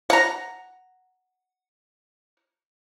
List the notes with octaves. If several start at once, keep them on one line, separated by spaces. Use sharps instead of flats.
F#5 A#5